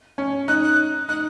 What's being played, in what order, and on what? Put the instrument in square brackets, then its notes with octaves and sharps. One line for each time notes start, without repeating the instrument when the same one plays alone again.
[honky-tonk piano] C#4
[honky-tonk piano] D#4 [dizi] F#6
[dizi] F#6
[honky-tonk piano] D#4 [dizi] F#6